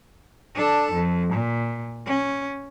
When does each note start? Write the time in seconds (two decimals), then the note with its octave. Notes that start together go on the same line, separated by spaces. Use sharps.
0.55 D4 A4
0.92 F2
1.33 A#2
2.06 C#4